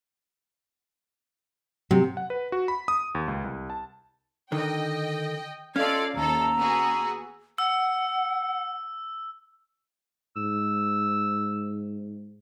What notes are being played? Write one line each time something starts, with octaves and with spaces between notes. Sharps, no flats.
C3 F#3
F#5
B4
F#4
B5
D#6
D#2
C#2
C2
A5
D3 D#3 D#5 G5
C#4 F4 A4 D5 D#5 F5 G#6
D#2 A4 A#5 E6
B3 F#4 G#4
F#5 E6
G#2 E6